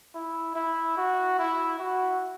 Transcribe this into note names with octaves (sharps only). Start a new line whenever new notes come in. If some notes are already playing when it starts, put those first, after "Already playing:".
E4
E4
F#4
E4
F#4